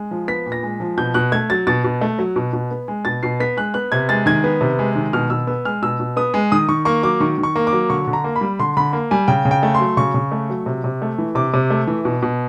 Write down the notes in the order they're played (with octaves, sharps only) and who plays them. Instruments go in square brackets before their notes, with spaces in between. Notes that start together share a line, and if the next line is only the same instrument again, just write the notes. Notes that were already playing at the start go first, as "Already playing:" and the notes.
Already playing: [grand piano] G#3
F3
B3 B6
A#2
A#6
G#3
F3
B2 G6
B2 F#6
A3 G#6
F#3 A6
B2 A6
B2
A3
F#3
B2
B2
B3
G#3
B2 A6
B2 C7
B3 B6
G#3 F#6
B3 F#6
C3 G#6
G#3 A6
D#3 G#6
B3
C3
G#3
D#3
B2 F6
B2 E6
B3 E6
G#3 F6
B2 E6
B2
B3 D#6
G#3
D#3 D#6
D#3 C#6
A#3 C#6
F#3 D6
D#3 C#6
D#3
C#6
A#3
D6
F#3
D3 C#6
D3
A#5
A#3
B5
G3
D3 C6
D3 B5
A#3
G3 G#5
C#3 G5
C#3
G5
A3
C6
F#3
C#3 C#6
C#3
A3
F#3
C3
C3
A3
E3
C3 D6
C3
A3
E3
B2
B2